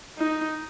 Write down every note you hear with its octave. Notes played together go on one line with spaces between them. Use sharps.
D#4